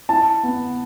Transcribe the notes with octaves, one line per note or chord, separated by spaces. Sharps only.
E4 A5
B3